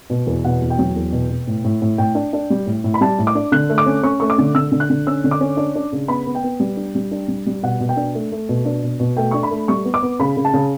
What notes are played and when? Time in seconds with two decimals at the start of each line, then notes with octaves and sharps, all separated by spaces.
0.10 B2
0.27 E2
0.44 B2 F#5
0.62 E2
0.70 G5
0.79 F#3
0.96 E2
1.12 B2
1.30 B2
1.47 A2
1.64 A2
1.82 A2
1.98 A2 G5
2.15 D4
2.33 D4
2.50 G3
2.66 A2
2.84 A2
2.94 B5
3.01 G3 A5
3.19 A2
3.27 D6
3.35 D4
3.52 D3 F#6
3.70 A3
3.78 D6
3.86 C#4
4.03 C#4 C#6
4.20 A3 C#6
4.30 D6
4.38 D3
4.55 D3 E6
4.72 D3
4.80 F#6
4.90 D3
5.07 C#4 E6
5.24 D3
5.31 D6
5.41 C#4
5.57 D4
5.75 D4
5.92 C#3
6.08 B3 B5
6.26 B3
6.35 G5
6.44 B3
6.60 G3
6.77 D4
6.95 G3
7.11 D4
7.28 G3
7.46 G3
7.63 B2 F#5
7.80 B2
7.89 G5
7.97 D4
8.15 A3
8.32 A3
8.49 B2
8.65 D4
8.83 B2
9.00 B2
9.17 A3 G5
9.31 D4 C#6
9.43 B5
9.51 A3
9.68 G3 C#6
9.85 B3
9.94 D6
10.03 B3
10.20 C#3 B5
10.36 C#3
10.45 A5
10.54 C#3